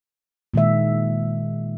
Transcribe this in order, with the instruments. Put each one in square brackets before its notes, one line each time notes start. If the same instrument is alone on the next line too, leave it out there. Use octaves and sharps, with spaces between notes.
[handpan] A#2 D#3 G#3 E5